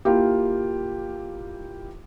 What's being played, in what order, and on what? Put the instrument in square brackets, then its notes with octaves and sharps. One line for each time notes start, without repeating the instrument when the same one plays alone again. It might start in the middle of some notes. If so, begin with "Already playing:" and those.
[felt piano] A#3 E4 F4 G4